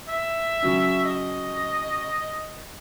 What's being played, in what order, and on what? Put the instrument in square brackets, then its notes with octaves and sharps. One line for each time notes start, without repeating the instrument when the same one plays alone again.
[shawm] E5
[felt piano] C#3 F#3 C#4
[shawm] D#5